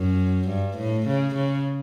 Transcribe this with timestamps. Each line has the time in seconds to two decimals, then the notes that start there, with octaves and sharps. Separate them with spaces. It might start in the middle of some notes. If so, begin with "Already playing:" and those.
Already playing: F#2
0.48 G2
0.77 A2
1.06 C#3
1.35 C#3